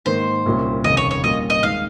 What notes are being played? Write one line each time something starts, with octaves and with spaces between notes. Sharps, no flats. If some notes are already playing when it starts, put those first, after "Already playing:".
G#2 D#3 A#3 D#4 C5
C2 A#2 G3 C#4
F1 D#2 C#3 D#5
C#5
C#5
A#2 G3 A#3 C#4 F4 D#5
D#5
D#2 D#3 G#3 F5